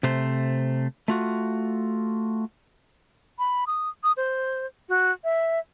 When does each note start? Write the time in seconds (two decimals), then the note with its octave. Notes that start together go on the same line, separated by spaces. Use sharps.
0.03 C3 A3 C5
1.08 A3 F4 F#4
3.39 B5
3.67 D#6
4.04 D#6
4.17 C5
4.89 F#4
5.24 E5